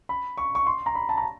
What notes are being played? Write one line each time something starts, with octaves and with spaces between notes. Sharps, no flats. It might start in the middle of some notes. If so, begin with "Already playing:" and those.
B5
C#6
C#6
C6
A#5
B5
A5
A#5